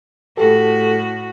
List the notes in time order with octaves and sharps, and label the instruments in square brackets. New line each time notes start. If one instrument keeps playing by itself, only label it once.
[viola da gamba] A2 F#4 [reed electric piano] G4 A4